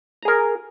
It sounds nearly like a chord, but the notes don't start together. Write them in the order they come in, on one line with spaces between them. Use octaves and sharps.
A#5 G#4 A#4